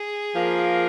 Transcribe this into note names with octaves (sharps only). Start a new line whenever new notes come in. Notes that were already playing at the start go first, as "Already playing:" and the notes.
Already playing: G#4
F3 A#3 F4 A#4